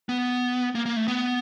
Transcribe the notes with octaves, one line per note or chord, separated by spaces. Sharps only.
B3
A#3
A#3
A3
B3